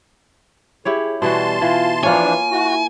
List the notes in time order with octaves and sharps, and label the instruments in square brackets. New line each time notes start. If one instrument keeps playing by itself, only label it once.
[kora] E4 G4 C#5 [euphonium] G#4
[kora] B2 E3 F#4 [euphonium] G3 [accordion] A5 C6
[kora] E3 [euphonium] F4
[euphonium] E3 [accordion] F3 D4 [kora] A#3 F4 C#5 [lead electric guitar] G#5
[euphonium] E4 [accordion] F#4